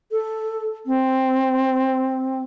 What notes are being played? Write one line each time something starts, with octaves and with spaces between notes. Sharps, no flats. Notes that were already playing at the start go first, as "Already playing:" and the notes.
A4
C4